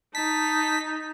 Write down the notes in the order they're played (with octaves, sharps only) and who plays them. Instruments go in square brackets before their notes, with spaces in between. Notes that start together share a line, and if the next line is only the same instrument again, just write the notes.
[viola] D#4 [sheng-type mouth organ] A5 [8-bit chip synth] B6